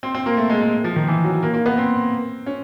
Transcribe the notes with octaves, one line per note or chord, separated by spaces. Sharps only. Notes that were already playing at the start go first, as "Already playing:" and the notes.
C4
C4
A#3
A3
G#3
G#3
F3
D#3
E3
F#3
A#3
A#3
B3
C4
C#4